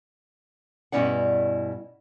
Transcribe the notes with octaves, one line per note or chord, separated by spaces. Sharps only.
G2 B2 C#4 E4 D5 F#5